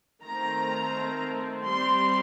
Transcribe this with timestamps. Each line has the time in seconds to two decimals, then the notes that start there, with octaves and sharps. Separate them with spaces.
0.24 D#3 A3 C4 A#5
1.66 G3 C4 C6